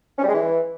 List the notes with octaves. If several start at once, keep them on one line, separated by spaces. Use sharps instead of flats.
C#4
G3
G#3
E3